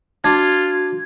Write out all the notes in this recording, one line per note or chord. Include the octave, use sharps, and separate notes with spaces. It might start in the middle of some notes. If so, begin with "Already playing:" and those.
D4 F4 F#4 G#6